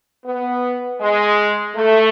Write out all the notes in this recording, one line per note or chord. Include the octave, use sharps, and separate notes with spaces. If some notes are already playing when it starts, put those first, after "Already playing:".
B3
G#3
A3